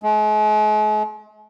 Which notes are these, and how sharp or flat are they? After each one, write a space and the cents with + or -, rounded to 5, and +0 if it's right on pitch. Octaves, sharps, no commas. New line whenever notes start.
G#3 +45